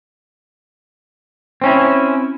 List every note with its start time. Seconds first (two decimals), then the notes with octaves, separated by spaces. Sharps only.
1.62 C4 C#4 E4